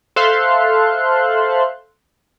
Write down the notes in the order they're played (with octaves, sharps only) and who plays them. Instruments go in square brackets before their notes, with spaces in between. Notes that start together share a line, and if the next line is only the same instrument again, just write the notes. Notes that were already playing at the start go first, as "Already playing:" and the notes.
[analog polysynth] A4 C5 E5 F5 C6 F#6